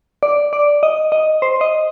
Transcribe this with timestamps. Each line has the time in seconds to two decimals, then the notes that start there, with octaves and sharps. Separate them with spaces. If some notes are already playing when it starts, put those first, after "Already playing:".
0.23 D5
0.53 D5
0.83 D#5
1.12 D#5
1.42 C5
1.61 D#5